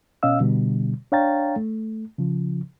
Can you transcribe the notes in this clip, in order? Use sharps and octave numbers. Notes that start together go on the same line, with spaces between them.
B2 C#4 D#5 F5 E6
B2 D3 G3
D4 C#5 F5 G5 A#5 A6
A3
C#3 F3